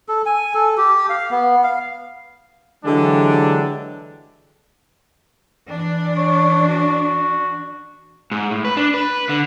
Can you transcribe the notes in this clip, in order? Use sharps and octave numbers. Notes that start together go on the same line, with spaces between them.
A4
G#5
A4
G4
F5
B3
F5
D3 E3 F#3 G#3 D4 G4
E3 D4
C#5
F#4
G#2
A2
B4
D4
B4
D3